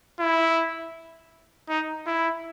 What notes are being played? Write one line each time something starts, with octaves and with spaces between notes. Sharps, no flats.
E4
D#4
E4